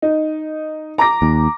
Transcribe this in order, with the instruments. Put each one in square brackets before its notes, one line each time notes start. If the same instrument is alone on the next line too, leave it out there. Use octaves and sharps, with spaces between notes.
[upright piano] D#4
A#5 D6 A#6
[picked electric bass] D#2